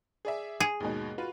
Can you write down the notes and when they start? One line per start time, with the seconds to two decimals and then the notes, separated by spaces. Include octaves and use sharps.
0.25 G#4 D5 E5
0.60 G#4
0.80 D#2 G#2 B2
1.18 F4 F#4 B4